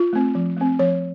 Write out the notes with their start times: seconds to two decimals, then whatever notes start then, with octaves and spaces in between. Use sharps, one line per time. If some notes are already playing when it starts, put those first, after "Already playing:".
Already playing: F4
0.13 A3 C4
0.35 F3
0.57 A3 C4
0.79 F3 C#5